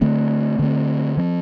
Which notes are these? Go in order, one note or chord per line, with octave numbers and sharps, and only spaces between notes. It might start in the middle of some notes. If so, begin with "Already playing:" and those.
D3 A3 C4
D3 A3 C4
F3 C4